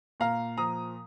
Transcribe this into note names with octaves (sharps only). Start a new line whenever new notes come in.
A#2 F5 A#5
F3 A#5 D#6